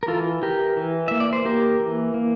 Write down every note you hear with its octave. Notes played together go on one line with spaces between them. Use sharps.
A#4
E3 F4 A4
E3 G4 A#4
E3
A#3 E5
D5
C5
A#3 G4 A#4
E3
A#3